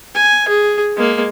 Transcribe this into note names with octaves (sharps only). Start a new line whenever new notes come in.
G#5
G#4
G#3 A#3